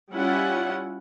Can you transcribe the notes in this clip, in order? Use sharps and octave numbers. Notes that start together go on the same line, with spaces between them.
G3 C#4 E4 F4 F#5